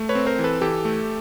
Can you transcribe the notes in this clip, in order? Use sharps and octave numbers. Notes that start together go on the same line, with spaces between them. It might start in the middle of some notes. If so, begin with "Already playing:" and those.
Already playing: A3
B4 C#5
C4
A#4 C5
E3
A4 B4
E3 G4 A4
A3